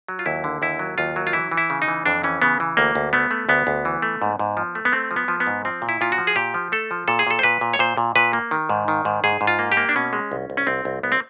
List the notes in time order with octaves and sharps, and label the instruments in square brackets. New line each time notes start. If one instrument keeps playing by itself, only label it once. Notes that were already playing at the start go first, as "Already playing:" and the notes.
[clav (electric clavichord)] F#3
F4
D#2 E4
D3
D#2 E4
F#3
D#2 F4
F#3
F4
E3 E4
E3
E4
C#3
D#4
E3
F2 D4
E3 C#4
C#3 B3
E3
D2 A#3
D2
A3 B3
A3
D2 B3
D2
E3
A3
G#2
G#2
F3
A3
B3
A3 C4
F3
B3
F3
B3
G#2
F3 C4
A#2
E4
A#2 F4
F#4
F3
G#4
A#2 G4
F3
A3 A4
F3
A#2 A4
G#4
A#2 A4
C5
A#2 B4
A#2
C#5
A#2 C5
A#2
A#2 B4
A#3
D#3
G#2
D#3
G#2
G#2 G#4
G#2
F4
A#3
G4
A#3
D4
B2 C#4
G#3
C2
C2
C#4
C2 C4
C2
C2 B3
C4